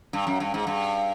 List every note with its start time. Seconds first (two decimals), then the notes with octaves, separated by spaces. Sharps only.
0.13 G2
0.27 F#2
0.40 G2
0.54 G#2
0.67 G2